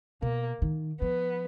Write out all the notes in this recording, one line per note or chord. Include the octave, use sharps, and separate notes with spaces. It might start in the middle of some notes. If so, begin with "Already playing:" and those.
B2 A#3
D#3
F3 B3